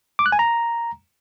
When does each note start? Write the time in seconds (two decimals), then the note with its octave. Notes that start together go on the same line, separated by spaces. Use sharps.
0.19 D6
0.26 F#6
0.32 G#5
0.39 A#5